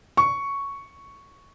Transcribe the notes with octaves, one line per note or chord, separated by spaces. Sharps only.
C#6